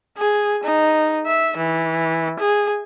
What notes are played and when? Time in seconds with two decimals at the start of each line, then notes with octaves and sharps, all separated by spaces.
0.18 G#4
0.64 D#4
1.26 E5
1.57 E3
2.39 G#4